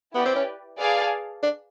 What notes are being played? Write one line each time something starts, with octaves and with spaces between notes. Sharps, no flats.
B3 E4 G4 B4 D5
C4
C#4
G#4 B4 D5 F5 A5
D4